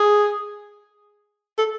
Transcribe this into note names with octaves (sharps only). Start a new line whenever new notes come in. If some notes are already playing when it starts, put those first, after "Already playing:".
Already playing: G#4
A4